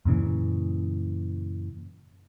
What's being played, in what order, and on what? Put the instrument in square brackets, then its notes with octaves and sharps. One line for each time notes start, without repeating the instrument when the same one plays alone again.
[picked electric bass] F#2 A#2 C#3 E3